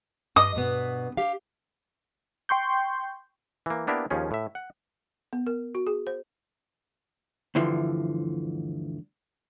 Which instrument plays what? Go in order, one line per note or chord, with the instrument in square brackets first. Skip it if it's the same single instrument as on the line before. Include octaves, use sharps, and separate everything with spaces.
[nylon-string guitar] G2 D#5 [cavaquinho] D#6
[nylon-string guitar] G2 B2 B3
G4 F5
[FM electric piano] G5 C6 C#6 G6
[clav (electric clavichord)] E3 A#3
A#3 B3 D4 E4 G4 A#4
D#2 F3 C#4 G#4
A2 E5
F#5
[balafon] B3
A#4
F#4
G#4
C5
[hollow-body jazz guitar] D2 G2 D3 E3 F3